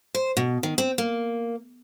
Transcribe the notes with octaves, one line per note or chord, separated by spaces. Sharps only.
C5
B2
D#3
C4
A#3